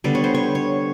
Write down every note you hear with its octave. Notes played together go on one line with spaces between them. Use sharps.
D3 G3 B3 D5
C#5
C5
C#5
C#5